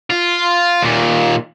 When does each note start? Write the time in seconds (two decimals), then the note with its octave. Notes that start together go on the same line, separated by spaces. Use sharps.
0.10 F4
0.82 D#2 A#2